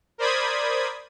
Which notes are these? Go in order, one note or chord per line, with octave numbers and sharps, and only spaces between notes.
A#4 C5 D5 B5 D#6 G#6